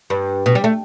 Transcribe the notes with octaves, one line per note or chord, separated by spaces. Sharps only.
G2
B2
G3
A3